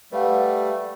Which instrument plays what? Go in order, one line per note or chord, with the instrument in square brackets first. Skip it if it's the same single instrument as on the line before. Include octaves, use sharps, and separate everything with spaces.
[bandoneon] G3 A3 [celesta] B4 F5 F#5